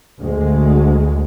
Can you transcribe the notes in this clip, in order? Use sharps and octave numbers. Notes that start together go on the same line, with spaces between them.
D2 G#3